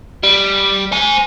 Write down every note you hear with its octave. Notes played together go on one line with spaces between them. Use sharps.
G3
C5 G#5